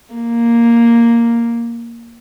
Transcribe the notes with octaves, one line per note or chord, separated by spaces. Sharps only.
A#3